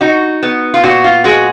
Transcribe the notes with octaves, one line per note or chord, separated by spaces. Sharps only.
D#4 F#4
B3
F4
A#2 F#4
F4
G#3 F#4